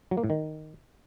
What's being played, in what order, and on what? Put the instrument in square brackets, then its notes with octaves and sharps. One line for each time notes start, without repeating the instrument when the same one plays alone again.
[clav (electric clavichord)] F#3
A#3
A2
D#3